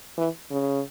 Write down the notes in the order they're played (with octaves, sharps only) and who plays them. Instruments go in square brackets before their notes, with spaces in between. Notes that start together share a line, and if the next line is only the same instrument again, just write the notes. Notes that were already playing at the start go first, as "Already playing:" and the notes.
[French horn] E3
C#3